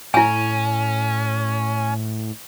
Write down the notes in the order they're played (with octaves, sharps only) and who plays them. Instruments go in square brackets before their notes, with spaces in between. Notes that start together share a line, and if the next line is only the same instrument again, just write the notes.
[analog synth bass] A2 [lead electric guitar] C#4 [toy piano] E4 G#5